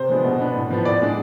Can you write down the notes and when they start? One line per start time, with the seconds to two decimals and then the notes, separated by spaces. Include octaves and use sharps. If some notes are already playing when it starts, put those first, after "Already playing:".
Already playing: C3 C5
0.09 F3 G#3 B3 D4
0.24 B2
0.40 B3 D4
0.56 A2
0.70 F3 B3
0.85 A2 D5
1.02 G#3 D4